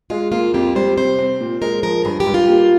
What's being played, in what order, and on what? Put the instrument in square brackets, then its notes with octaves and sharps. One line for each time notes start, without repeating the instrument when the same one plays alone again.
[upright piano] G#3 [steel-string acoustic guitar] F4
[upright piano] A#3 [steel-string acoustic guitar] F4
[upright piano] F2 [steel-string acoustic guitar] G4
[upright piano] G3 [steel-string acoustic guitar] C5
[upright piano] C3 [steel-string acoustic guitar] C5
[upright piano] C4
A#2
[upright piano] G#3 [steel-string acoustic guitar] A#4
[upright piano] F3 [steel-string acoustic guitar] A#4
[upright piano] G2 [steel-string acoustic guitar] G#4
[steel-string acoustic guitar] G4
[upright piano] G2
[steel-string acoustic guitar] F4
[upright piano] A#3